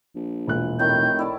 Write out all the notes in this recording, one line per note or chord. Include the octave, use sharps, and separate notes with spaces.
A#1
E1 A#2 F#6
F1 A2 D#3 G6
E4 D5 A5